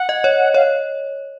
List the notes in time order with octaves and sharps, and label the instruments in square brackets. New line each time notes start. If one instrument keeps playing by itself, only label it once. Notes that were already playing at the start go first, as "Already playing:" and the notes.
Already playing: [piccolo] F#5
[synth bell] D#5
C#5
[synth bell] C#5 [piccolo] F5